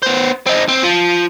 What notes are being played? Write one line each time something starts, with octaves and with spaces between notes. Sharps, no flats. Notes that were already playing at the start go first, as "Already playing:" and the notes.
B3 C5
C4 D#4
C4
F3